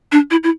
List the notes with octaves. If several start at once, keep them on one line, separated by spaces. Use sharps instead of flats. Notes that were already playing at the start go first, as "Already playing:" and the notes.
D4
E4
E4